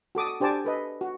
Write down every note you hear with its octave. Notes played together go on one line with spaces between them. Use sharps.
F#4 A4 D6 D#6
D#6
D4 G4 C5 G#5 A5 D6
A4 B4 D#5
F#4